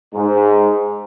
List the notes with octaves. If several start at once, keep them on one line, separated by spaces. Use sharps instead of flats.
G#2